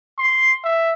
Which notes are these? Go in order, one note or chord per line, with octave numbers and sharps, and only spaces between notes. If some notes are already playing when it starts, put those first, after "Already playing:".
C6
E5